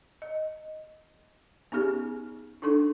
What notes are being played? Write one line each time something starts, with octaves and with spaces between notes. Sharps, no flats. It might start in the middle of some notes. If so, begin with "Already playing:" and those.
D#5
B3 C#4 D#4 G4 G#4
D4 D#4 A4 C6 C#6